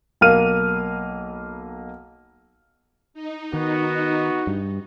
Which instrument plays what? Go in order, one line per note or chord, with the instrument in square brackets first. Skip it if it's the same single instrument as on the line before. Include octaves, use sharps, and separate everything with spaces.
[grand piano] B1 A#3 F5 F6 D#7
[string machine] D#4
[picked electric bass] D#3 [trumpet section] B3 F#4
[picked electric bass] G2